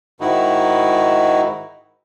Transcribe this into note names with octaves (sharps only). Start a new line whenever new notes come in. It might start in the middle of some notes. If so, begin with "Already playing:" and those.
G#2 D#3 D#4 E4 F#4